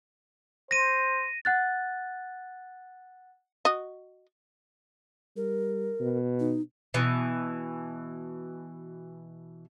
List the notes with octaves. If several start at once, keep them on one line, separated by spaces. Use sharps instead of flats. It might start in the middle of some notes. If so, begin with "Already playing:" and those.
C5 A#6 D#7
F#5 F#6 A6
F#4 D#5
G3 A#4
B2
D#4
B2 E3